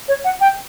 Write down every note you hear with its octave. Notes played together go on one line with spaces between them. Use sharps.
C#5
F#5
G5